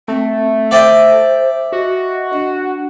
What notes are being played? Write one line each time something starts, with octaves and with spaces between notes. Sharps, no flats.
A3 C4
C5 D5 E5 G5
F#4 D#5
D4